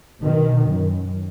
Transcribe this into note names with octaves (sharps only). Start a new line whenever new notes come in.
B2 D#3
F#2